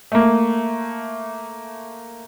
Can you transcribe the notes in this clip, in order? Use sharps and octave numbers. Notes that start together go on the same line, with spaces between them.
A3 A#3